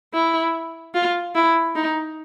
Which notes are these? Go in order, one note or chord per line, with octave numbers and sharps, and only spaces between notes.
E4
F4
E4
D#4